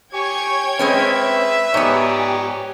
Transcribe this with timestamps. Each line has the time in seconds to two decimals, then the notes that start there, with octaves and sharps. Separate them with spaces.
0.14 G4 C#5 G5 G#5 C#6 G#6
0.79 G#3 C4 C#4 B4 E5
1.74 G#2 B3 G4 C#5 D5 G#5 A#5